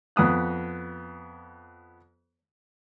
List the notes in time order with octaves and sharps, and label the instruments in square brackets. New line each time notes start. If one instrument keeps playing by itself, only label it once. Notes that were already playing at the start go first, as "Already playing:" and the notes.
[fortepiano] F2 B3 D#6 F#6